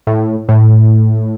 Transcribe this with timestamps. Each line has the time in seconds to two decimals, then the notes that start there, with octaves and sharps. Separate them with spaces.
0.07 A2
0.49 A2